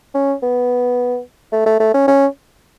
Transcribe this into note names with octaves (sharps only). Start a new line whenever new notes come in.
C#4
B3
A3
A3
A3
C#4
C#4